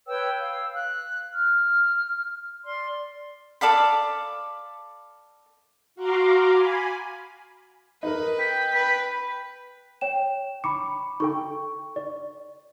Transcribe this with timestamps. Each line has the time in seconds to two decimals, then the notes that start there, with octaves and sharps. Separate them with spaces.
0.07 B4 C#5 G5 E6
0.40 F5 E6
0.74 F#6
1.33 F6
2.65 D5 C6
3.61 A4 D5 F5 B5
5.95 F#4 F5 A#5 C6 D6
6.51 G#5 B5
8.03 D#4 A#4 B4
8.39 G5 B6
8.74 B4
10.01 C#5 G5 E7
10.64 B5 C#6 D6 C#7
11.20 D#4 A4 G5 C#6
11.96 D5